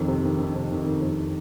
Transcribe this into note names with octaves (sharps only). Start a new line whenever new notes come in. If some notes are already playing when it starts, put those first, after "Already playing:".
Already playing: F2 D#3
C3
D#3
D#3
C3
D#3
D#3
F2